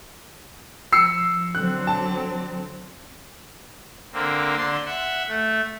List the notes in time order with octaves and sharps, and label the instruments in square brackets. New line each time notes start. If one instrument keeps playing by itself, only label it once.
[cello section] F3 [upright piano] E6 C7 C#7
[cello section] D3 F#3 C4 [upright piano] F#6
[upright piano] A5
[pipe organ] D3 A#3 C4
D3 D4 C6
E5 F#5
A3